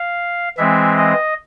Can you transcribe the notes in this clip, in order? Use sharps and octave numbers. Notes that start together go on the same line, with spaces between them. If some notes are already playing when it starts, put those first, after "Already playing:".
Already playing: F5
E3 G#3 C4 E5
D#5